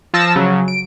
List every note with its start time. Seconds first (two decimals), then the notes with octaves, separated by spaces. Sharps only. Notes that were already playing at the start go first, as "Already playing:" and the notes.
0.14 F3 A5 E6 A#6 E7
0.36 C#3 F#3
0.68 D7